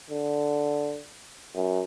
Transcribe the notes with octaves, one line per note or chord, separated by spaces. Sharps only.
D3
F#2